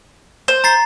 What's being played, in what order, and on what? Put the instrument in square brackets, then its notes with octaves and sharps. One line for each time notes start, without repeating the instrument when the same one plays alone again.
[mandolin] C5
[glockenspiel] A#5 A6 C7